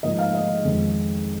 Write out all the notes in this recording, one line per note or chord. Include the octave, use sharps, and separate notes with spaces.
G#2 F3 A#3 D#5
F5
D#5
F2 D#3 G#3